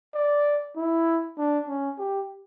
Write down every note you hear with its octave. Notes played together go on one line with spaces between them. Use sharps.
D5
E4
D4
C#4
G4